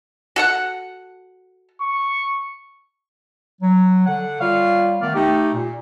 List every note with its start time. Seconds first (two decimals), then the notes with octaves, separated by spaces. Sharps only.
0.36 F#4 A4 F#5
1.81 C#6
3.62 F#3
4.07 D3 F#5
4.40 G3 F4 C#5 F5
5.01 D#3 A3 B3 D5 F6
5.14 A3 D#4 G4
5.53 A#2